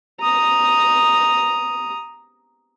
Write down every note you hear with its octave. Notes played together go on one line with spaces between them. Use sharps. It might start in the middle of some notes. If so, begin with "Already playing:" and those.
A#5 D#6